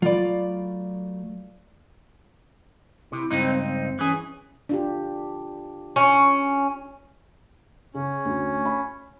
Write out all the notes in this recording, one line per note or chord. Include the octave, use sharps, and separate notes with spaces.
F#3 A3 F4 D5 B5
C3 E4
C#2 G2 C4 D#4
C4
E3 C#4 G#4
D4 F4 G4
C#4
C#3 C#4
D2
B5